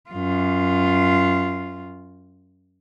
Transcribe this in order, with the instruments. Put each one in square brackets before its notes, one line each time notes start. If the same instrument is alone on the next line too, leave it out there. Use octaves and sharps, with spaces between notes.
[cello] F#2 F4